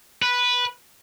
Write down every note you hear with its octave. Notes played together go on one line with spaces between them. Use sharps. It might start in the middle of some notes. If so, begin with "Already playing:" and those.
B4